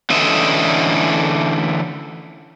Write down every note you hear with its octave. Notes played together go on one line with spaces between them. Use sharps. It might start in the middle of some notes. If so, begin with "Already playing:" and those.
D3 E3 A3 C#4 D#5 E5